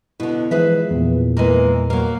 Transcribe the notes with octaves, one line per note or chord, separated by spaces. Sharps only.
B2 D3 E4
E3 F3 G#3 G#4 B4 E5
E2 A#2
E3 G#3 A#3
F#3 A#3